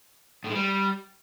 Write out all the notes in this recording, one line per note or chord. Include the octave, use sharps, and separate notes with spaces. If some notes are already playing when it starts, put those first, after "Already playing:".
A2
G#3
G3